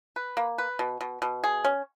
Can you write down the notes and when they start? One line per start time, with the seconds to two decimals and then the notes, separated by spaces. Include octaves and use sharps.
0.16 B4
0.37 A#3
0.58 B4
0.79 B2
1.01 B2
1.22 B2
1.44 G#4
1.64 C#4